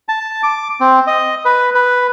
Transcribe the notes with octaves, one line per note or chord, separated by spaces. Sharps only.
A5
D6
C4
D#5
B4
B4